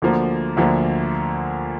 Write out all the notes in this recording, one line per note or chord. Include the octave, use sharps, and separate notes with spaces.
D2 D3 F3 A#3
D2 D3 F3 A#3